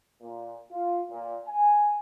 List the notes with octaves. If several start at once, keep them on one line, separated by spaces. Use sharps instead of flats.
A#2
F4
A#2
G#5